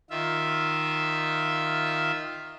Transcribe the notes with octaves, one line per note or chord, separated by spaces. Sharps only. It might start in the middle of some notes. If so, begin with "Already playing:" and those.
D#3 F4 E5